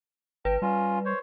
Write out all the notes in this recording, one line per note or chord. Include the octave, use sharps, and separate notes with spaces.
G#1 B4 G5
G3 C#4 F4
C5 C#5